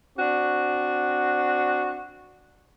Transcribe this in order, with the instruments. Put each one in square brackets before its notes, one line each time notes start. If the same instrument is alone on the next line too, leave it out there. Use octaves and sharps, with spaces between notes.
[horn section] C4 D4 F#4